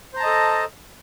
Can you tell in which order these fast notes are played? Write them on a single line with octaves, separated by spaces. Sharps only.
C5 A#5 A5 D#5 A4